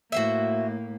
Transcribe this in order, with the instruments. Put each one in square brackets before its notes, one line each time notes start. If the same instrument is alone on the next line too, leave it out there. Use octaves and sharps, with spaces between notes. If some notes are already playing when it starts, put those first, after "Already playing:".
[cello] A2 A#3 [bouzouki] F#4 C5 E5